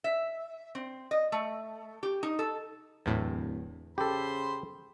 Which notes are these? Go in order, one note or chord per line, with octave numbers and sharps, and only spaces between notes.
E5
C4
D#5
A3
G4
D#4
A4
D1 E2 A2
C#3 G4 A4 C5 B5 C6